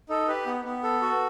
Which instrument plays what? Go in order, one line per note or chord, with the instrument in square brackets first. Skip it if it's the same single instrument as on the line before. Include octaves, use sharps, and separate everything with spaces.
[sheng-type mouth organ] D#4 A4
G4 B4
B3
B3
A4
F#4